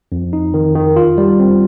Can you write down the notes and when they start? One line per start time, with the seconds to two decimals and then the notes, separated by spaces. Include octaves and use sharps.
0.12 F2
0.33 D#4
0.54 D#3
0.75 D#3
0.96 F4
1.18 G3
1.40 C4